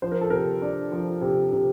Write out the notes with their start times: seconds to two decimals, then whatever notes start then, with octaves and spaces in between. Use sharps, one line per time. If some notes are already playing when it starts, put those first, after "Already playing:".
0.02 F3 C5
0.12 A#4
0.21 A4
0.30 C3 A#4
0.62 D4
0.92 F3
1.21 C3
1.52 C3